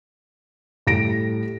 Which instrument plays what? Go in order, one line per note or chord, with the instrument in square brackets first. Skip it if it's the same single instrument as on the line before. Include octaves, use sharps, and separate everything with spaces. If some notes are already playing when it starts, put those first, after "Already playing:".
[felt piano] A2 G3 A#6 D7